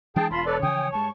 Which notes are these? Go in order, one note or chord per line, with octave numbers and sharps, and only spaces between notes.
E3 G#3 D4 G#4 G5 A5
E1 F4 A5 B5 C6
A4 B4 C#5 D5
C#3 E3 F3 G5 G#5 D#6
G2 G#3 A5 C#6